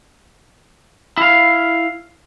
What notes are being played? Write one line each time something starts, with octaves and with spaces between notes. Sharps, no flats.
E4 F5